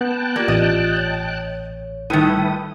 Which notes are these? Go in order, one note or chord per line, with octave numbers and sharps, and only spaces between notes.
B3 G5 A5 F#6
A#3 F4 G4 D5
A1 D#5
C#5
A2 D#3 G3 E4 B4 D#6 E6